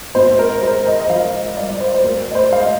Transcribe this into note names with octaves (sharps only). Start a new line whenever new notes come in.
G#1 C5
A#4
G#3 C5
D#5
D#5
F3 F5
D#5
G2 D5
C5
C5
D2 A#4
D5
C5
G#3 F5
D#5